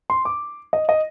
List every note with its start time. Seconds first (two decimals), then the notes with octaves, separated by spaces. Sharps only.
0.10 C6
0.25 D6
0.73 D#5
0.89 D#5